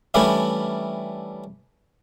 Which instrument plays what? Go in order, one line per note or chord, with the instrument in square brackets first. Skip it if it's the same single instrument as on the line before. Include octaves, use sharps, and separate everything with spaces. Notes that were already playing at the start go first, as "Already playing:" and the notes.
[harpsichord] E3 G3 A3 C#4 D4 E4